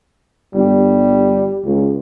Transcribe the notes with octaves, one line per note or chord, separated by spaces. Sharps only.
G1 G3
C#2